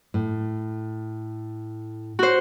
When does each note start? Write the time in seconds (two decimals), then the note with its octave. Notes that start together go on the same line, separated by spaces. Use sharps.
0.14 A2
2.19 F#4 C5